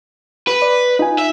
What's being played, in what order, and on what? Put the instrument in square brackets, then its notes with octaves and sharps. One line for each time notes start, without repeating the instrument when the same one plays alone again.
[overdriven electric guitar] B4
[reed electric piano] D5
D#4 F4 G#5
[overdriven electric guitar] E5